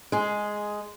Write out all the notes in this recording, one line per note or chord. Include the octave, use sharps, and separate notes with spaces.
G#3 G#4